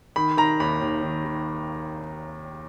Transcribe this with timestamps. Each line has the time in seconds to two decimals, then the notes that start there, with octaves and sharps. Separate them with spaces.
0.16 D#3 B5
0.37 D#3 A#5
0.60 D#2 B5
0.81 D#2
1.03 D#3
1.25 D#3